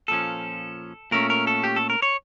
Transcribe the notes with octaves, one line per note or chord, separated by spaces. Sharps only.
A#2 F3 C#4 A4
A#2 A3 C#4 A#4
A#4
A4
G4
A4
A#4
C#5